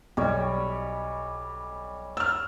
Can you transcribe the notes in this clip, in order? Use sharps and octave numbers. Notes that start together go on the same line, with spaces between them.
B1 G3 C#5
E6 F6